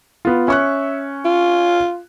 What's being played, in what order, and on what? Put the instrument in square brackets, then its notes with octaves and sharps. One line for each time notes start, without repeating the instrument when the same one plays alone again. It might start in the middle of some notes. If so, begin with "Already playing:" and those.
[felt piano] B3 F4
[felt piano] C#4 C#6 F#6 [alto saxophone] E5
[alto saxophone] F4